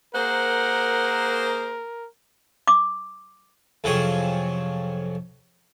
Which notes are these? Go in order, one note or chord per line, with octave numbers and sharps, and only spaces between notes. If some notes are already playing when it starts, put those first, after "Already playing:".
A#3 G#4 A#4 C5 F#5
D6
F2 C3 F3 F#3 C#4 G#4